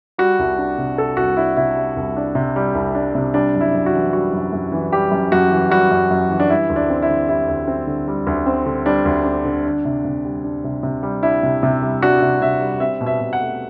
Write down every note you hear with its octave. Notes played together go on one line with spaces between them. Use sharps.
G3 F#4
C2
D4
C3
G3 A4
C2 F#4
D4 E4
C3 E4
G3
C2
D4
C3
G3
C2
D4
C3
G3 D4
F#2
E4
F#2
F#4
E3
G3 F#4
F#2
F#2
E3
G3 G4
F#2
F#2 F#4
E3
G3 F#4
F#2
F#2
E3
D4
G3 E4
D2
D4
C4
E4
D3
G3 E4
D2
C4
D3
G3
D2
C4
D3
G3 D4
D2
C4
D3
D4
C3
C3
G3
D4
C3
C3
G3
D4 E4
C3
C3
G3
D4 F#4
C3
C3 E5
G3
C4 E5
B2
E5
B2
F#5
A3